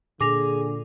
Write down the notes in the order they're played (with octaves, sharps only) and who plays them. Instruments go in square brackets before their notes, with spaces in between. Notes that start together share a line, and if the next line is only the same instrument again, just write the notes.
[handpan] A#2 [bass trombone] D3 [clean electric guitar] G#4 [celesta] D6 A#6 F7